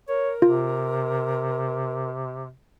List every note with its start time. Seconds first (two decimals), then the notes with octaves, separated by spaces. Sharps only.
0.08 A#4 C#5
0.42 C3 F4